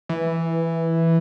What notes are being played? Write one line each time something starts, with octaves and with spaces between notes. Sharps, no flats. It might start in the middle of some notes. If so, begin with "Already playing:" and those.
E3